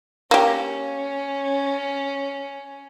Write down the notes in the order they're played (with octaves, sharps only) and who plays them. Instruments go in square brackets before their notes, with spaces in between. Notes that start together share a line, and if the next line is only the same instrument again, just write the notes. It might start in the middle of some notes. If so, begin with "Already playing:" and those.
[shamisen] A#3 G4 [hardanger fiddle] C#4